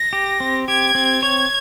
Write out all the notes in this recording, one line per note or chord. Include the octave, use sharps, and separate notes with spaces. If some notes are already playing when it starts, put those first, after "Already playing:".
Already playing: A#6
G4
C4
G4 G#6
C4
C#5 G#6